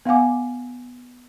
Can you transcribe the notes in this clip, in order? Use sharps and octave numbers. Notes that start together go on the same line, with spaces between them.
B3 F5 F#5 G#5 D6